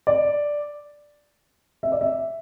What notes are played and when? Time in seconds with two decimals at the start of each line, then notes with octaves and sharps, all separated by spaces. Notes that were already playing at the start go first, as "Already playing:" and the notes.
0.07 D5
1.83 E5
1.92 D5
2.01 E5